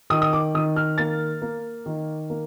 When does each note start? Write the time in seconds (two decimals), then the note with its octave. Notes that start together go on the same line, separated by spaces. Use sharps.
0.10 D#3 D#6
0.22 D#6
0.33 D6
0.54 D#3 D#6
0.76 F6
0.98 A#3 A6
1.42 A#3
1.86 D#3
2.30 A#3